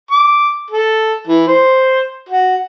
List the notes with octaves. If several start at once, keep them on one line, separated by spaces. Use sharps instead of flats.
D6
A4
E3
C5
F#4